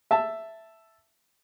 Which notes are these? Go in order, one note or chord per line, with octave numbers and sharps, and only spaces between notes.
E5 A5